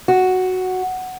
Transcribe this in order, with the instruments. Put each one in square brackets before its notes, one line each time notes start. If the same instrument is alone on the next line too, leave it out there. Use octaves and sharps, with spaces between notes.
[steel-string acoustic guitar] F#4